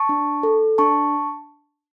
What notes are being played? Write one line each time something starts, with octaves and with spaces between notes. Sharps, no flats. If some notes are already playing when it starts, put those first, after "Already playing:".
Already playing: A5 C#6
D4
A4
D4 A5 C#6